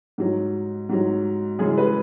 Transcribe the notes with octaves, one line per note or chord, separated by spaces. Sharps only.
G#2 F#3
G#2 F#3
F#2 C#3 E3 G#3 G#4
B4